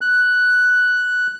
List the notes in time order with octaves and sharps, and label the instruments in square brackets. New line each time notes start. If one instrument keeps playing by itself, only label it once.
[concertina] F#6